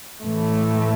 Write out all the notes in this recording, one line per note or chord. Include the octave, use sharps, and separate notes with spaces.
A2 E3 A3